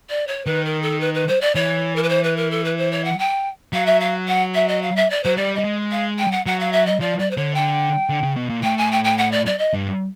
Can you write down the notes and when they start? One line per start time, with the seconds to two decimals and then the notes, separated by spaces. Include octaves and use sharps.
0.10 D5
0.27 C#5
0.46 D#3 B4
0.65 A#4
0.82 A4
1.00 B4
1.14 B4
1.28 C5
1.41 D5
1.55 E3 C#5
1.96 A#4
2.03 B4
2.09 C5
2.23 B4
2.37 A#4
2.51 A4
2.64 B4
2.77 C5
2.91 C#5
3.05 F#5
3.19 G5
3.73 F#3 F5
3.86 E5
4.00 F5
4.28 F#5
4.54 E5
4.68 D#5
4.82 F5
4.96 E5
5.10 D5
5.24 F#3 C5
5.37 G3 D5
5.55 G3 D#5
5.64 G#3
5.91 F5
6.19 G5
6.32 F#5
6.46 F#3 F#5
6.60 F5
6.72 E5
6.86 D#5
7.00 F3 D5
7.19 D5
7.31 C5
7.37 D3 C#5
7.55 G5
8.09 D3
8.23 C#3
8.36 B2
8.49 A#2
8.63 A2 G5
8.78 G#5
8.92 G5
9.04 G5
9.18 F#5
9.32 D5
9.46 D5
9.58 D#5
9.73 G2